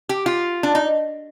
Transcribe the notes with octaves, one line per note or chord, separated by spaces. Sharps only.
G4
F4
D4
D#4